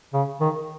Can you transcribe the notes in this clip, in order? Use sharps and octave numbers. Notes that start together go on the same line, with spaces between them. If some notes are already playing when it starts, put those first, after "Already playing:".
C#3
D#3